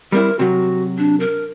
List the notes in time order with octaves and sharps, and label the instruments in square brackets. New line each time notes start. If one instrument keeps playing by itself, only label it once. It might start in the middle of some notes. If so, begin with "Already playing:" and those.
[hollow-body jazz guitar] G3 C4 E4 [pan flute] A#4
[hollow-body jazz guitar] C3 F#3 [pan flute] F#4
[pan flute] D4
A#4